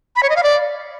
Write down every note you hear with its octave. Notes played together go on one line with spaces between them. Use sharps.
B5
C#5
D#5
F5
D5